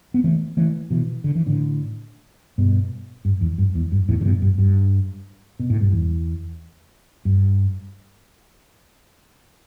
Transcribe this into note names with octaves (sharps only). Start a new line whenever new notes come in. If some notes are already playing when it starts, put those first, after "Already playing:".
B3
E3 A3
E3 A3
B2 E3
D3
E3
A2 D3
G2 B2
G2
E2
G2
E2
G2
E2 A2
D3
G2 B2
G2
G2
B2
A2
G2
E2
G2